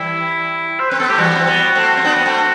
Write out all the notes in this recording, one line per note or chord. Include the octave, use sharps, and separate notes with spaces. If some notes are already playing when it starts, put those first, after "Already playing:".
Already playing: E3 G3 E4
C5
C4 B4
B3 A4
A3 G4
E3 G3 F#4
C4
G3 B3
A3 C4
C4
B3 D4
B3
A3 C4